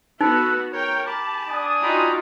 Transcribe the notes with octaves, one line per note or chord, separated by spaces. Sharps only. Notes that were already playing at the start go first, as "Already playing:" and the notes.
B3 D#4 F#4 A4 B4
A#4 C#5 G5
G4 A5 B5 D6
D4 G#5 D#6
D#4 F4 F#4 G5 A#5 B5